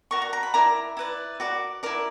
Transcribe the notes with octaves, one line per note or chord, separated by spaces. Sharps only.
F#4 A#4 D5 C#6
A#5
A#5
B5
E4 A#4 D5 A#5
E4 B4 D5
F#4 A#4 D5
E4 A#4 D5